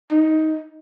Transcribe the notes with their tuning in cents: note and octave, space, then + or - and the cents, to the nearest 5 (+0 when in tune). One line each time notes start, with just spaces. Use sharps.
D#4 +15